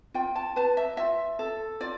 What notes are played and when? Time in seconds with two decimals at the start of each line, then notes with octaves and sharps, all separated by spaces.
0.14 F4 G5
0.35 A5
0.56 B4 A5
0.77 E5
0.97 F4 E5
1.39 A4
1.81 F4 D5